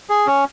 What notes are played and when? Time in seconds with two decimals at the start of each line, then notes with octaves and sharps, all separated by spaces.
0.09 G#4
0.27 C#4